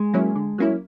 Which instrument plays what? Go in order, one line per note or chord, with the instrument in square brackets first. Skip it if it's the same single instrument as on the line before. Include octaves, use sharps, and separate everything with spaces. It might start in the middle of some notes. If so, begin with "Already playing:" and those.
Already playing: [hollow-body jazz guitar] G#3
[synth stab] F#3 A#3 C#4 E4
D3
F#3 A#3 C#4 E4